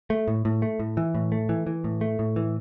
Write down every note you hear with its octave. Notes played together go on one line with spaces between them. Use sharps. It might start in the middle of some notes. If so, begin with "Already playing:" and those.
A3
A2
A2
A3
A2
E3
A2
A3
E3
E3
A2
A3
A2
E3